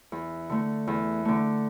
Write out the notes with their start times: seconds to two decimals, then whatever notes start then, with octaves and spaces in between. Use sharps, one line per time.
0.12 E2
0.50 D3 A3
0.87 E2
1.25 D3 A3